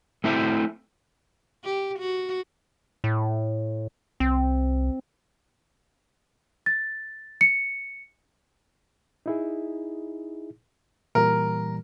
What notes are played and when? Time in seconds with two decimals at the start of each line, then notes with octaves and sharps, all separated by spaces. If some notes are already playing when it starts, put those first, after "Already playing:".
0.24 A3 C4 E4 C5 E5
1.64 G4
1.99 F#4
3.04 A2
4.20 C2 C4
6.66 A6
7.41 C#7
9.26 D#4 E4 G#4
11.15 A#2 E3 G3 A#4